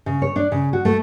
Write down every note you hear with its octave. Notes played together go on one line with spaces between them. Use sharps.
C#3
C#5
D4
C#3
F#4
A3